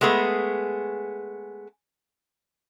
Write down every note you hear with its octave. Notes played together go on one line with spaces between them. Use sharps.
G#3 A3 B3 G#4